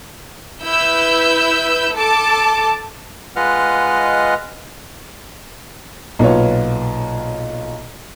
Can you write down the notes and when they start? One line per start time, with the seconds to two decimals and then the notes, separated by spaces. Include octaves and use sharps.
0.64 E4 B4 E6 G6
1.94 A4 A5 D6
3.36 G#3 F4 B4 D#5 F#5 F6
6.19 B1 A#2 B3 F4 C#5